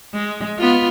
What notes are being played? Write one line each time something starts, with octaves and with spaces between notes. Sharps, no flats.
G#3
B3 F4